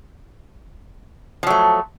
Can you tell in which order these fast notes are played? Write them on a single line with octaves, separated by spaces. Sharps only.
F3 F#3 A3